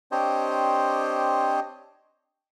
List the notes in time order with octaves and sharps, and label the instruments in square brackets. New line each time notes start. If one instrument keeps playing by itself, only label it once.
[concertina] C4 D4 G4 C5 C#5 D#5